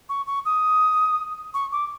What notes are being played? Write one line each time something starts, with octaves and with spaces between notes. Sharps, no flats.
C#6
C#6
D#6
C#6
D6